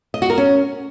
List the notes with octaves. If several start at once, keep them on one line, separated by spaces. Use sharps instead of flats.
D#5
F#4
A#4
C#4